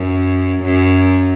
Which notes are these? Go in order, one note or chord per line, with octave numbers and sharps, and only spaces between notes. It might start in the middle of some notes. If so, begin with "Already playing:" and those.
Already playing: F#2
F#2